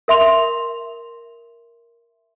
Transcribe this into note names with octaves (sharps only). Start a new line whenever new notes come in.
A#4 E5 C6 F7